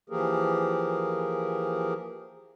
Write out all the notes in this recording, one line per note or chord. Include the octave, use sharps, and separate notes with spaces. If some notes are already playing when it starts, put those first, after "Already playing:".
E3 F3 A#3 G4 G#4 A#4